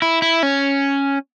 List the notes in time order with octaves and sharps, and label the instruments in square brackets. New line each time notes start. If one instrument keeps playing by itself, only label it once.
[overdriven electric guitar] E4
E4
C#4